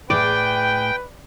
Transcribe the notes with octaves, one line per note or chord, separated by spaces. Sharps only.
A2 G#4 B4 D5 G5